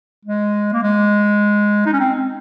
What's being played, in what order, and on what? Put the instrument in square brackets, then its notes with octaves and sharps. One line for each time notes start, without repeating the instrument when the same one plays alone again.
[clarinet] G#3
A#3
G#3
D#4
C#4
C4
C4